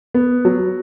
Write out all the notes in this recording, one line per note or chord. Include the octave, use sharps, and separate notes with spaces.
B3
F#3